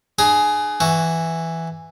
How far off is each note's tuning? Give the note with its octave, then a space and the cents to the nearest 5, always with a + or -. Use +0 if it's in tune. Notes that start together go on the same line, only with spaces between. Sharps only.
D4 +45 G#4 +10 A#5 +20
E3 +0 F#4 +0